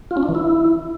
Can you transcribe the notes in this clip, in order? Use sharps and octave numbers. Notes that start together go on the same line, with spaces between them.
F4
C#4
D4
E3
E4